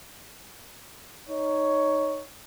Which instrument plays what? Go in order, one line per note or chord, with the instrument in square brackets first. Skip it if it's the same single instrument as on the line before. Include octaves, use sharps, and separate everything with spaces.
[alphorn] D#4 [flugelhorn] C#5